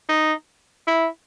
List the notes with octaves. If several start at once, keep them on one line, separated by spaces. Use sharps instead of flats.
D#4
E4